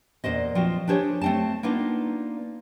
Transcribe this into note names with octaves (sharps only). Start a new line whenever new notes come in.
E2 A#2 C5 D#5
F3 C4 F4 F#4
D4 G4 G#4 C5 C#5
A3 C4 A5
A#3 B3 D4 D#4 F4